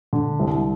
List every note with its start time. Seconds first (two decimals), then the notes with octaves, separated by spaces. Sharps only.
0.13 D3
0.40 C2